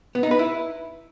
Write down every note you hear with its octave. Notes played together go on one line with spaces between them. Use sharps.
B3
D#4
B4
E4